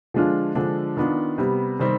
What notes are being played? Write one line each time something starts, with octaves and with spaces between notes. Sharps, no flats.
D3 F3 G#3 D4 F4
D3 F3 G#3 D4
D#3 B3 D4 F4
C3 G3 B3
C3 D#3 G3 C4